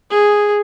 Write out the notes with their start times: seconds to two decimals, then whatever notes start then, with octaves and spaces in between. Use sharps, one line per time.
0.10 G#4